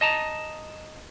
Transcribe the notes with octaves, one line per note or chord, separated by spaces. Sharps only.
D#5 A5 A#5